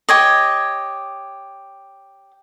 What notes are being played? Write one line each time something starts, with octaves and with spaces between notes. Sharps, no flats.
G4 C#5 D#5